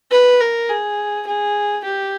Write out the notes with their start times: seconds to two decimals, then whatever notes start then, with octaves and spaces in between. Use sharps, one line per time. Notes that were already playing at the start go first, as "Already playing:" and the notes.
0.11 B4
0.40 A#4
0.69 G#4
1.27 G#4
1.84 G4